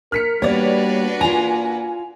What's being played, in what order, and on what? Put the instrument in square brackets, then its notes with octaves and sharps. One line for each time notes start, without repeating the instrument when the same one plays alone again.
[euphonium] A#4 [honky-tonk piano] F6 B6 C#7
[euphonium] G3 [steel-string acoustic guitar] A#3 B3 [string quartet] D4 F#4 B4 [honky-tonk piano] C#5 D5
[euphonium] A#2 [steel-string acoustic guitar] F4 A#5 [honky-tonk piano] G#5